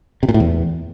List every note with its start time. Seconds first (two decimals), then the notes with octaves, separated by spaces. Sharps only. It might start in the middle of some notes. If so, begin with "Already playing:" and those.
0.23 C3
0.29 A#2
0.34 A2
0.40 E2